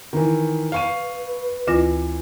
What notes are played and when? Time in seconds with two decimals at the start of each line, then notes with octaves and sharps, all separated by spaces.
0.13 D#3 E3
0.72 B4 F5 C#6 D#7
1.67 D2 E3 F4 A#6